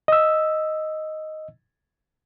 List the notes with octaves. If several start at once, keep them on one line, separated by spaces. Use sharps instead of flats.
D#5 E6